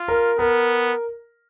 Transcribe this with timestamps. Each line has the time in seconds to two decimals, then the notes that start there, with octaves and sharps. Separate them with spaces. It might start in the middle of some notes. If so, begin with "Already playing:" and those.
Already playing: F4
0.08 A#4
0.38 B3 A#4